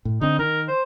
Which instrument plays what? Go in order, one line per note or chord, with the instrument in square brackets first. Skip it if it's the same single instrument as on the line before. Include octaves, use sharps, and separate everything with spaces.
[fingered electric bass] A2
[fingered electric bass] D3 C4 [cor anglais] D#4
[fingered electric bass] D#3 [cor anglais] A#4
[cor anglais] C5